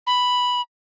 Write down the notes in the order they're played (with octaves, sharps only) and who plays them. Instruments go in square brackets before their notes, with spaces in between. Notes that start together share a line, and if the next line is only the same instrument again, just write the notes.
[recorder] B5